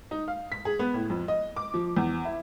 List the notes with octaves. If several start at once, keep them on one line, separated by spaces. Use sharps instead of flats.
D#4
F5
B6
G#4
B3
A2
F2
D#5
D6
F3
E2
E4